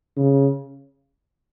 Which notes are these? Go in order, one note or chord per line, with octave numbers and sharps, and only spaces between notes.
C#3